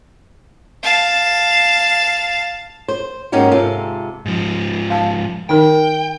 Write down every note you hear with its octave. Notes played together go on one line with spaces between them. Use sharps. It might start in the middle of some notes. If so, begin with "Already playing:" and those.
F5 A5
C5
G#2 A#3 C#4 D#4 F#4 G4
G#2 C3 F4 A4
G#2 F3
F5 A5
D#3 D#4 A#4 G5